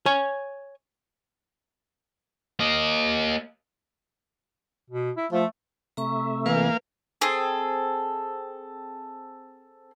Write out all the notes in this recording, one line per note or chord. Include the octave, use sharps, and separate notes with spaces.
C#5 G#5
A#3 D#5
B2
E4
F3 A3
C3 A3 E5 A#5 C#6
E3 A#3 B4 F5
C4 G#4 A4